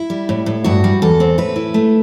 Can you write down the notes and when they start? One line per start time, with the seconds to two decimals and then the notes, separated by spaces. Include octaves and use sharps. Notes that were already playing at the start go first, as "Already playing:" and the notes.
Already playing: E4
0.10 G3
0.29 A2
0.46 A2
0.64 G2 F#4
0.84 G3
1.02 E2 A4
1.20 C4
1.38 A2 B4
1.56 E4
1.74 A3